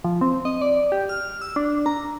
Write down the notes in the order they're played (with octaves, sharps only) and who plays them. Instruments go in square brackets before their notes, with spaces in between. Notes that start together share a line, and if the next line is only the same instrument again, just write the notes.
[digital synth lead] F3
C4
D#5
D5
G4
F6
E6
D4
A#5